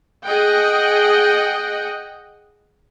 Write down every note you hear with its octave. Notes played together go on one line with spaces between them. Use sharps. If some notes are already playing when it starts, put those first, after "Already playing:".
G#4 D#5 F#5 G5